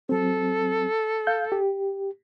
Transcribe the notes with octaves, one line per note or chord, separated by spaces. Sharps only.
F#3 C4 A4
F5 G6
G4